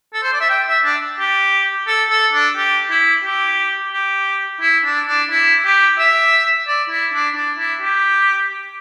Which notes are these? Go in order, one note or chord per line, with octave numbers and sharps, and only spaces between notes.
A4
C5
D5
E5
G5
E5
D4
G4
A4
A4
D4
G4
E4
G4
G4
E4
D4
D4
E4
G4
E5
D5
E4
D4
D4
E4
G4